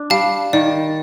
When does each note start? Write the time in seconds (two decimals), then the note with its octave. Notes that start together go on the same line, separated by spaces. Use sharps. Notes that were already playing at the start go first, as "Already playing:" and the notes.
Already playing: D4
0.10 G3 F5 A5
0.53 D#3 D5